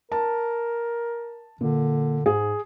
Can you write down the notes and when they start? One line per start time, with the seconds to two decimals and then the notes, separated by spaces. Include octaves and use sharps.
0.12 A#4 A5
1.61 A#2 D3
2.26 G#2 G#4